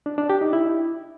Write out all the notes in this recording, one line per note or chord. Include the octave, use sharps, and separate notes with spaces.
D4
D4
G4
D#4
E4